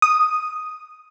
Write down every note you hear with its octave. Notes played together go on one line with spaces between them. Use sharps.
D#6